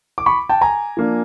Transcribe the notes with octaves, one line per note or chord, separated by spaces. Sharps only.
D6
B5 C#6
G5 A5
G#5 A#5
F3 A#3 D4